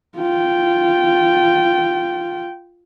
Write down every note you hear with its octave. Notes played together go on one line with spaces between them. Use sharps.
F4 G5